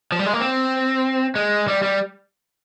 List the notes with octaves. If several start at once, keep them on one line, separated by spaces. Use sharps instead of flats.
F3
G3
G#3
A#3
C4
G#3
G3
G3